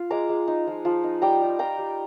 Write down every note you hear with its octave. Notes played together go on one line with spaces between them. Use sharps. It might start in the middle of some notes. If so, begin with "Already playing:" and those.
Already playing: F4
G#3 A#5 D6
G#3
D#4
F3
F3
D#4
G3 G5 A#5
G3
F4 G5 A#5
G3